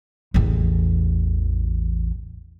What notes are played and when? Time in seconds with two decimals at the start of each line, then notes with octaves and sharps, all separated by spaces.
0.34 A1 E2